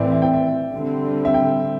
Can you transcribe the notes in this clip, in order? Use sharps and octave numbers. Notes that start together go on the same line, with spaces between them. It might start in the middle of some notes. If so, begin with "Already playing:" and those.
Already playing: A2 E3 C4 D5 E5
E5
G5
E5
D3 G3 C4
E5
G5